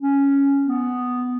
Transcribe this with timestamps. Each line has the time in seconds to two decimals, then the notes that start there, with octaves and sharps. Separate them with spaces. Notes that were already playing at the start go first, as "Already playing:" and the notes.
0.01 C#4
0.67 B3